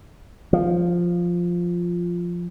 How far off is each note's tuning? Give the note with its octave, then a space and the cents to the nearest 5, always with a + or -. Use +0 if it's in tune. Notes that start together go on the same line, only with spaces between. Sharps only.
F3 +0